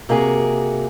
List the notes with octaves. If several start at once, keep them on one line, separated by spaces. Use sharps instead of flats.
C3 A#3 F#4 G#4